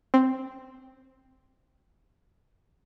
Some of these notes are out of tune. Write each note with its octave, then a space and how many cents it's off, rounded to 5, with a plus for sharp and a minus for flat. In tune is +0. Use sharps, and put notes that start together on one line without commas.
C4 +0